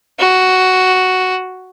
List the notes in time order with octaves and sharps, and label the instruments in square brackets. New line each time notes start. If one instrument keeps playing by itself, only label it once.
[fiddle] F#4